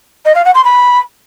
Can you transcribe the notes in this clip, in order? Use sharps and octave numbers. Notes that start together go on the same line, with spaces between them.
D#5
F5
F#5
C6
B5